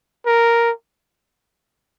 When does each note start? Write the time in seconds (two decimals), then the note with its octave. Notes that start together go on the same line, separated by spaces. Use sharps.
0.26 A#4